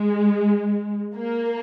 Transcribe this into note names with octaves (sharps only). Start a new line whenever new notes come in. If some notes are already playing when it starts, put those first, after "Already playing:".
Already playing: G#3
A#3